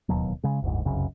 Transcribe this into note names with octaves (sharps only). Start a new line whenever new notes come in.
D1 D#2 B2 F#3
C#3 G#3
F#1 D2 G#2
F1 C2 F#2 C#3